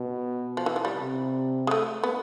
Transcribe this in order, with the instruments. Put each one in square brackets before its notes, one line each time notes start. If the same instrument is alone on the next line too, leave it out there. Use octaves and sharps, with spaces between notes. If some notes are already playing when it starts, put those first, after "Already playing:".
Already playing: [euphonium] B2
[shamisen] F3
E3
F3
G3
[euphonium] C3
[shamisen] G#3
A3
B3